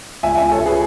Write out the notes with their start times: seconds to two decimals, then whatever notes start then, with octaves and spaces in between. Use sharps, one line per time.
0.23 C#2 E5 G#5
0.37 E5 G#5
0.42 C#2
0.52 A4 C#5
0.60 C#2
0.66 G#4 B4